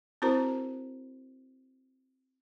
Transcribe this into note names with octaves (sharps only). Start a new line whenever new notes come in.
C4 E4 F#4 A#4 C5 A#5